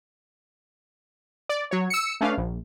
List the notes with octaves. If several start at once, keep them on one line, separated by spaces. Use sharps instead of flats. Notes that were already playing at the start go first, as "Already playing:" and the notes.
D5
F#3 C#5
E6 C#7
A3 C#4 D4 B4 F5
A#1